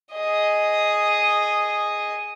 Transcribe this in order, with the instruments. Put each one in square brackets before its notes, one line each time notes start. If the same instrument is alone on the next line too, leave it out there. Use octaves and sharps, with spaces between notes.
[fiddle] G#4 D#5